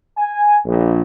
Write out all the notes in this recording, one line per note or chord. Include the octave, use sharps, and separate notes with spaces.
G#5
A#1